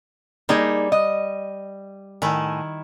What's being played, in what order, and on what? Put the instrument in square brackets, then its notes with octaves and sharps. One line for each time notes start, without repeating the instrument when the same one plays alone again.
[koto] G3 [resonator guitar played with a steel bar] A#3 D#4 G#4
[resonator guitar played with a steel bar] D#5
[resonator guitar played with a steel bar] A2 G#5 [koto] D#3 E4